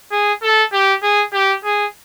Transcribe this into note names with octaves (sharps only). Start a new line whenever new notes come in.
G#4
A4
G4
G#4
G4
G#4